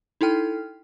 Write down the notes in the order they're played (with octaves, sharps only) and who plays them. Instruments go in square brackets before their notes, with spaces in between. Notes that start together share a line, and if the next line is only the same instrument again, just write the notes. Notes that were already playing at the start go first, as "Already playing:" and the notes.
[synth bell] D#4 E4 A4 G5 F6